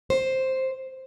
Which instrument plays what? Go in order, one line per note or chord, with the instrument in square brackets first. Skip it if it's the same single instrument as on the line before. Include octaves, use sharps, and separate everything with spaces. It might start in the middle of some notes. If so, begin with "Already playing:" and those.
[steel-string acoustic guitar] C5